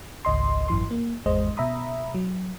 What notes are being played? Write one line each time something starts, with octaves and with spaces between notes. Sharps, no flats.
G#1 C#2 D#5 C6
G#1 F#2 E3 C6
A#3
G#1 E2 G#3 C5 D#5
B2 E5 A#5 B5 D#6
F#3